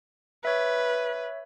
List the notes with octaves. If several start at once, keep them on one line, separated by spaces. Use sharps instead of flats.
B4 C#5 E5